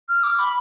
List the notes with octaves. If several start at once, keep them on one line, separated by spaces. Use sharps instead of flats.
F6
D6
B5